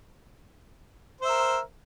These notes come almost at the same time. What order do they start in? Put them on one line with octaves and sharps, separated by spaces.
C5 E5 A#4